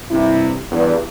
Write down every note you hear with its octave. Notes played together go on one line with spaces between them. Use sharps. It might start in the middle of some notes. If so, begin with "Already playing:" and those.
G2 C3 E4
E2 G2